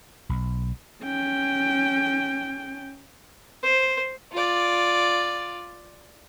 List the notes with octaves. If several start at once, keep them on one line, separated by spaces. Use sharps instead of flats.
B1
C#4 G5
C5
F4 D5